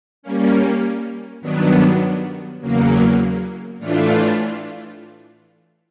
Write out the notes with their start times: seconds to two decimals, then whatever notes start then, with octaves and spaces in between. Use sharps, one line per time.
0.23 G3 A#3 C#4
1.41 G2 D#3 F#3 B3 D4
2.61 E2 C#3 F#3 A#3
3.79 A2 E3 A3 D4 F4